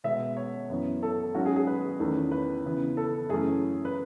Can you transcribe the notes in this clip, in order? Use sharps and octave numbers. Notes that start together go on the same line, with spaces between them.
B2 G#3 B3 E5
C#5
F#2 E3 B3
A4
G#2 F#3 C#4 F#4
G#4
G#4
B4
E2 D#3 A3 C#4
B4
C#3 E3 B3
A4
F#2 E3 A3 C#4 G#4
B4